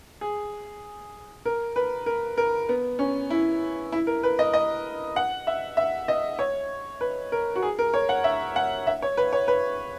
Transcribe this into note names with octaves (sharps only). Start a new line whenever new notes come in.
G#4
A#4
B4
A#4
A#4
B3
C#4
E4
E4
A#4
B4
D#5
D#5
F#5
E5
E5
D#5
C#5
B4
A#4
F#4
G#4
A#4
C#5
F#5
E5
F#5
E5
C#5
B4
C#5
B4